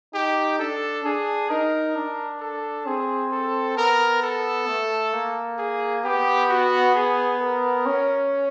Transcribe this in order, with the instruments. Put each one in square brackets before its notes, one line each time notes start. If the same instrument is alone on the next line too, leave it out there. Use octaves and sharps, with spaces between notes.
[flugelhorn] D#4 [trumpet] G4
[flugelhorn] D4 [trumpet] A4
[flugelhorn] D4 [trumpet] G#4
[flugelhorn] D#4 [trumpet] A#4
[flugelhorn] D4
[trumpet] A4
[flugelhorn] C4 [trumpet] G#4
[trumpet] A4
[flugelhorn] B3 [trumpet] A#4
[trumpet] A4
[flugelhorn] A3
A#3
[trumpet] G#4
[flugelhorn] B3 [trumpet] G4
[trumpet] F#4
G#4
A#4
[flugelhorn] C#4